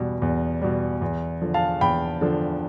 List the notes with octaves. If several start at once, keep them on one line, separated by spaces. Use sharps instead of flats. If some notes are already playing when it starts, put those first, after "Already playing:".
Already playing: E2 B2 G3
E2
B2 G3
E2
D3 F3
F5 A5
E2 G5 B5
D3 F3